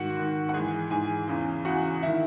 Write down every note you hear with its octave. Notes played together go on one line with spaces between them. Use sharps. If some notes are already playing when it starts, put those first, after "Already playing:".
Already playing: G#2 D#3 F#4 F#5
G#2 D#3
F#5
G#2 E3 G#4 G#5
G#2 E3 G#4 G#5
E2 C#3 E3
E2 C#3 E3 F#4 F#5
D#3 E4 E5